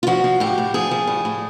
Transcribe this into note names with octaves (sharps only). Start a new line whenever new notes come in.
F4
F3 F#4
F3
A2 G4
A2
F3 G#4
F3
A2
A2